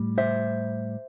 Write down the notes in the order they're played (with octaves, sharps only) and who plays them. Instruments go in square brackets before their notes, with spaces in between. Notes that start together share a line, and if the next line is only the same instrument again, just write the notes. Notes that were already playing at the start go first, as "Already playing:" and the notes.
Already playing: [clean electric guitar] A2 G3
C5 E5